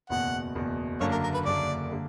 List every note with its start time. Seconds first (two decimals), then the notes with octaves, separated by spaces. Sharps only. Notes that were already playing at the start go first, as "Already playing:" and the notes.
0.09 F#1 E2 B2 F#5
0.55 F#1 E2 B2
1.00 F#1 F#2 D3 A#3 D4 C#5
1.11 A#4
1.24 A#4
1.34 B4
1.45 F#1 F#2 D3 A#3 D4 D5
1.91 D3 G3 A#3